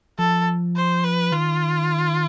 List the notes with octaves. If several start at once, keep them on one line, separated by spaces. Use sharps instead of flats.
F3 A4
C5
B4
D#3 F4